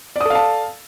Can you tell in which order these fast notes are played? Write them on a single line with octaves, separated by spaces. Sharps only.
D5 D#6 A4 F5 A5